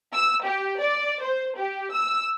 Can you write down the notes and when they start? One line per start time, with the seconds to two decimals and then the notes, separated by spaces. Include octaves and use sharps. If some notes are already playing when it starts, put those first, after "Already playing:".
0.13 E6
0.44 G4
0.79 D5
1.22 C5
1.57 G4
1.92 E6